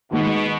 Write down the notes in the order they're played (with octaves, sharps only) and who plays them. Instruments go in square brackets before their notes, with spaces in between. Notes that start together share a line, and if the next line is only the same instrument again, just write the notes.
[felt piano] D#2 D#3 G#3 [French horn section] B2